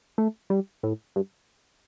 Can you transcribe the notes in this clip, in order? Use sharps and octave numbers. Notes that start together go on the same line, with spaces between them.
A3
G3
A2
G2